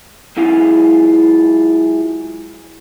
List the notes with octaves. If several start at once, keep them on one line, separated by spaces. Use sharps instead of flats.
F#3 G#3 E4 F4 G#4 F5